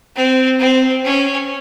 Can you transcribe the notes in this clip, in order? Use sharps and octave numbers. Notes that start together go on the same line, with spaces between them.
C4
C4
C#4